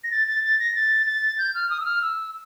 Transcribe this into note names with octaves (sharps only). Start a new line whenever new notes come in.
A#6
A6
A6
A6
A#6
A6
A6
G6
F6
D#6
E6
F6
E6